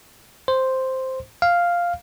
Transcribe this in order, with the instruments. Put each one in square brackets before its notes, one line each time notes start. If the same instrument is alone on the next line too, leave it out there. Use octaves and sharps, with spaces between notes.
[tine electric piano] C5
F5